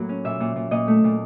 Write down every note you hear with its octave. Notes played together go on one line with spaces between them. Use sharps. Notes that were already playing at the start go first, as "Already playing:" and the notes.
Already playing: A2 F#3 A#3
C#4
A#2 E5
A#2
A#2
A#2 D#5
A3
A#2